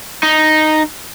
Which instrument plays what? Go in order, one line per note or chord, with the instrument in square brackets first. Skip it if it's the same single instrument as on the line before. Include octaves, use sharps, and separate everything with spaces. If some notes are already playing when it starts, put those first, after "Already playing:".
[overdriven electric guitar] D#4